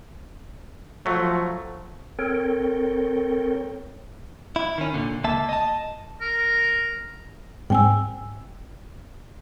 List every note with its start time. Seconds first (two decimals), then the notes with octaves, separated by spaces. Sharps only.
1.06 F3 F#3 A3
2.19 C4 A4 A#4 C#5 G5
4.56 E4
4.78 D#3 C#4
4.94 A#2 D3
5.24 C#2 A#3 E5 A5
5.49 D#5 A5
6.21 A#4
7.70 G#2 G3 C4 G5 G#5 E6